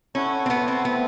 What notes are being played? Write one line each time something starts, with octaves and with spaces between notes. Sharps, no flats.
C#4 E4 A4 C#5 F#5
C4
B3
C4
A3 B3 C4 E4